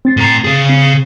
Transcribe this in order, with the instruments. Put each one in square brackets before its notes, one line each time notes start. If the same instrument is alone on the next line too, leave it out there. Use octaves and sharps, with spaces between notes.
[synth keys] C4 A6 C7
[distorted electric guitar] A2 A#5
C#3 G#4
[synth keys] C4